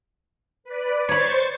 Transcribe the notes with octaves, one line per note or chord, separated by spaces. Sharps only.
B4 D5
C5 C#5 B5 C#6 A6